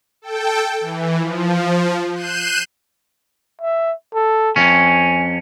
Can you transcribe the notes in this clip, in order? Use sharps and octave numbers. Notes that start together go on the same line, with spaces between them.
A4 G5
E3
F3
F#6 G6 C7 D#7 E7
E5
A4
F2 C#4 G#5